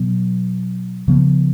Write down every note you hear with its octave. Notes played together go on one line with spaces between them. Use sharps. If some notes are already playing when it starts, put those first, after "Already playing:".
Already playing: B2 F#3 B3
C#3 F3 B3